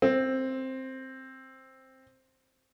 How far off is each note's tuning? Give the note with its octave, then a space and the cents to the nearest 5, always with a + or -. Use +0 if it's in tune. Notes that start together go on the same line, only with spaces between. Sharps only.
C4 +5